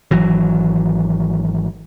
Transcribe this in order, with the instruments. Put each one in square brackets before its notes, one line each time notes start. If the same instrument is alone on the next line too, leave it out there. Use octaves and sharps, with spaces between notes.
[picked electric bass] G#1 E3 F#3